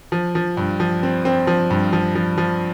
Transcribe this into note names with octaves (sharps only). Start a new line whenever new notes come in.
F3
F3
G2
F3
C4
C4
F3
G2
F3
F3
F3